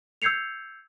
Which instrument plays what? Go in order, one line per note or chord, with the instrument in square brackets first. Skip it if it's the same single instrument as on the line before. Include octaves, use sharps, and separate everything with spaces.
[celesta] E6 G6 G#6 C7 C#7 F7